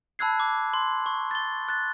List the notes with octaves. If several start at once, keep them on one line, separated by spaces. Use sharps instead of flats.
A5 B5 E6 F#6 G#6 C7
D6
C6
C#6
A6 G7
F#6 A6